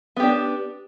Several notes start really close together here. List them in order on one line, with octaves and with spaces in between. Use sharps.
B3 G4 D4